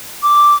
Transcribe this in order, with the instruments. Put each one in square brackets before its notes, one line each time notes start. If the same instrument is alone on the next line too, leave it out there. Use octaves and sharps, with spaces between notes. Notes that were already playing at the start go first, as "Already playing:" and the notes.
[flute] D6